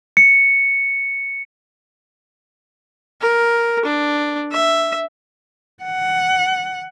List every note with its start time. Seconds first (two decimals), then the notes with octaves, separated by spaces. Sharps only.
0.17 C#7
3.21 A#4
3.85 D4
4.52 E5
5.83 F#5